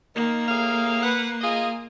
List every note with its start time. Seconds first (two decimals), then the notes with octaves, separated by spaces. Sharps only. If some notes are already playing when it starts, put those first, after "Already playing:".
0.15 D#3 A#3
0.48 A2 G#4 F5
1.03 B4 F#5
1.41 F4 G#4 D#5